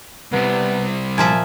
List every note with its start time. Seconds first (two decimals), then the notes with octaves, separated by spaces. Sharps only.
0.33 C2 C3 B3
1.18 A#2 F3 E5 G#5